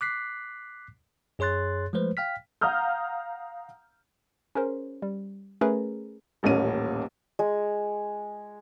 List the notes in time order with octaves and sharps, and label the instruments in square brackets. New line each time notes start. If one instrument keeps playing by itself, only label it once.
[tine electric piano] D6 F#6 B6 C7
F#2 G#4 C#5 C6 F#6 A6
F3 G#3 A3 B4 C5
F5 G5 F6 B6
[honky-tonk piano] F5 F#5 A#5 D#6 F6 G6
[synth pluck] C#4 G#4 A#4 C5
G3
A3 C#4 G#4 A#4 B4
[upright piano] D#1 A1 A#2 C#4 D#7
[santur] G#3